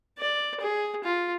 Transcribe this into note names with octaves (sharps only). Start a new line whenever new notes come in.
D5
G#4
F4